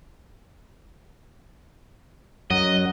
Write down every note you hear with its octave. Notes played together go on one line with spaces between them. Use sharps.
F#2 F#3 D#5